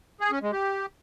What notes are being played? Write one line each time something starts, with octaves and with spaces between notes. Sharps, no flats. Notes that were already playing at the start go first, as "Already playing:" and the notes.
G#4
C#4
G#3
G4